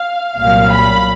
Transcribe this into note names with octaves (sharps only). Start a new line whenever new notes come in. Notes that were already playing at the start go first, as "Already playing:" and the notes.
Already playing: F5
C2 A#2 F#3 F5
B5